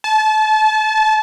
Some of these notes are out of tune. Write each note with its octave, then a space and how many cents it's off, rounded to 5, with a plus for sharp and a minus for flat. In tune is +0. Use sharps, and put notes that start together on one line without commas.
A5 -30